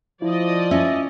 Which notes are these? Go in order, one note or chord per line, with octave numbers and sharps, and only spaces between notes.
F3 E4 D5 D#5
C#4 E5